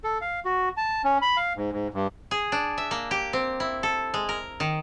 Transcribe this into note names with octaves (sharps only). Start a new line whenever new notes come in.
A4
F5
F#4
A5
C#4
B5
F5
G#2
G#2
G2
G#4
D4
E5
A#3
G4
C4
E4
A4
G#3
A#4
D#3